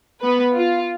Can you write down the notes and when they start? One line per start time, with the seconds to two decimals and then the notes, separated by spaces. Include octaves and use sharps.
0.21 B3 B4
0.55 F4